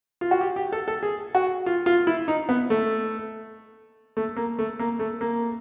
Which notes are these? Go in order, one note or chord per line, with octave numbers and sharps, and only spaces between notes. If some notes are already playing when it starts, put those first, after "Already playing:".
F4
F#4
G4
G4
A4
A4
G#4
F#4
F4
F4
E4
D#4
B3
A3
A3
A#3
A3
A#3
A3
A#3